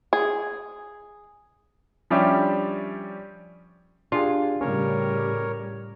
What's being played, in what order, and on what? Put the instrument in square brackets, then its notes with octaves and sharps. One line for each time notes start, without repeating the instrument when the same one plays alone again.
[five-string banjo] G#4
[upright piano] F3 G3 C#4 D4 G4 E5
[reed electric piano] D4 G4 G#4 [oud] F4
[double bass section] A2 C#3 G3 [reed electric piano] C#4 [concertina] A#4 C#5